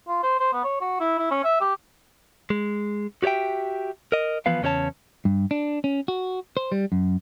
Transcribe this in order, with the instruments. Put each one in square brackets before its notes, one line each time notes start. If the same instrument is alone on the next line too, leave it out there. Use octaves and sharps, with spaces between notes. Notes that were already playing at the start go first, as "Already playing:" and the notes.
[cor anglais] F4
C5
C5
B3
C#5
F#4
E4
E4
C#4
E5
G4
[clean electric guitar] G#3
F#4 G4 C#5 E5 G5
A#4 D#5
E3 F3 B3 B4 F5
E2 C#3 C#4 G4 C#5 A5
G2
D4
C#4
F#4
C5
G3
F#2